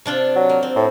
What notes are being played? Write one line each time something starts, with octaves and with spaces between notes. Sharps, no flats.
C3 D4 F4
F#3
A#3
C4
A2